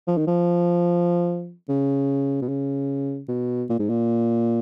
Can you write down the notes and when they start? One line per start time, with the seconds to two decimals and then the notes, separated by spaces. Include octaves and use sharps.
0.08 F3
0.17 D#3
0.27 F3
1.69 C#3
2.42 B2
2.49 C#3
3.28 B2
3.69 A#2
3.79 G#2
3.89 A#2